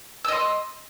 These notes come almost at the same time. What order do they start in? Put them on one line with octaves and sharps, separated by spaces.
E6 D#5 C6